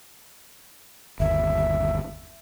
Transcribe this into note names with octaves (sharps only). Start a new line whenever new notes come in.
G1 D#2 E5